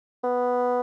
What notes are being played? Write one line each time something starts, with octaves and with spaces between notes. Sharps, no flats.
B3